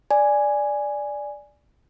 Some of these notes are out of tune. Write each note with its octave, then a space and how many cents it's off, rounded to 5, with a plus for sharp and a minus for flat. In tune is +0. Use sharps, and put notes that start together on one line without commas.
D5 +0 G#5 +0